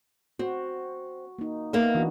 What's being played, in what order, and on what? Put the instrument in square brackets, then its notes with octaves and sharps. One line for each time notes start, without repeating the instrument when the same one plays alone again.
[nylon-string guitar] C4 [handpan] F#4
[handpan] A#3 D#4
[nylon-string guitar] A#3 E5 [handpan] B3 D#4
[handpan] E3 D4 F#4